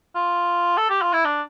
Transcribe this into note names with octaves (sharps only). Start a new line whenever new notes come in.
F4
A4
G4
F4
E4
D4